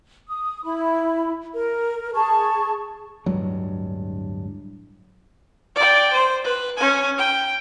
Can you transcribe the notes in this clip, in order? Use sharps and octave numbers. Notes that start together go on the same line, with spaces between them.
D#6
E4 B5
A#4
G#4 A5 C#6
D1 G2 F#3 G#3
D5 G5
C5
B4
C#4 G#5
G5